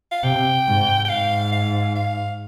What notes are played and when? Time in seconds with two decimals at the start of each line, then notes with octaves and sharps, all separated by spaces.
0.12 F5
0.23 C3 G5
0.67 G#2
1.05 G5
1.09 G#2 F5
1.52 F5
1.95 F5